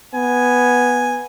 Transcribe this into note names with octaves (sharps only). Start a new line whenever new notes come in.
B3 G#5